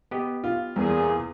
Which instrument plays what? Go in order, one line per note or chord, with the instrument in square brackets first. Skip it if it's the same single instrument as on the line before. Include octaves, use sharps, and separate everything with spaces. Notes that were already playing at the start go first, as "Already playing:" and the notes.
[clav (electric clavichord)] B3 G4 D#5
[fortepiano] F4
[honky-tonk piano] E2 [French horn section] A#2 G#4